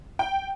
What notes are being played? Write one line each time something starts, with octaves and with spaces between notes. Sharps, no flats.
G5